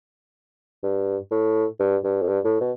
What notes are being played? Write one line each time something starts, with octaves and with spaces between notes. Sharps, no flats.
G2
A2
G2
G2
F2
G2
A2
B2